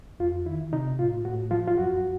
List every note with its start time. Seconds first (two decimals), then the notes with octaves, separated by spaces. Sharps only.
0.20 F2 F4
0.46 D#3 E4
0.72 C3 D#4
0.99 A2 F4
1.25 A2 F#4
1.51 F3 F4
1.68 F4
1.78 F#2 F#4